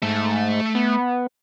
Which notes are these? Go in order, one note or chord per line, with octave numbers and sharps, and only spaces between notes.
G#2 A3 A5
B3